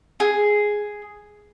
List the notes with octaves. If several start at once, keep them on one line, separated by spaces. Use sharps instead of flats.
G#4